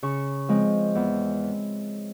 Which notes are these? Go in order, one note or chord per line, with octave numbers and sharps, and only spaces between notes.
C#3 C#6
F3 G#3 C4
E2